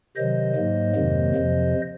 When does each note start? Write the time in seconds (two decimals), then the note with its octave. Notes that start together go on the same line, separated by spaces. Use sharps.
0.16 C3 D#3 F#3 C5 D#5
0.55 G#2 F#3 A#3
0.95 F2 C3 D#3 F#3 A#3
1.35 F2 C3 F3